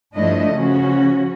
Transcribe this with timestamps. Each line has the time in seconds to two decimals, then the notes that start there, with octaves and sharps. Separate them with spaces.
0.15 G2 F3 A3 D4 E4 D#5
0.52 C#3 F3 C#4 F#4